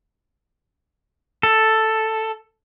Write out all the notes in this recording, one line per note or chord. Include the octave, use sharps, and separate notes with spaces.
A4